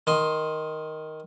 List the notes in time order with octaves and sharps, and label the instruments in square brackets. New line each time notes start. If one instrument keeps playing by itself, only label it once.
[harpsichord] D#3 D#5 C6